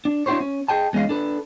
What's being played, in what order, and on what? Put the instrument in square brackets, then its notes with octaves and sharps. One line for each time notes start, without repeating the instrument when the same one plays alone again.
[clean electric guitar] D4
D4 E4 F#4 G4 C5 C#5
C#4
G#4 D#5 G5 A5
E2 G#3 C#4 D#5 F5
D4 A4 B4